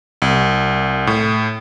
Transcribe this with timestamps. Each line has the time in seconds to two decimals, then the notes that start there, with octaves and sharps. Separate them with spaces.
0.22 C2
1.07 A2